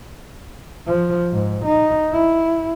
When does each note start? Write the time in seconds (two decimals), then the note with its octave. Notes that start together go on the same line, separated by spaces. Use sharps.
0.87 F3
1.32 G#2
1.65 D#4
2.13 E4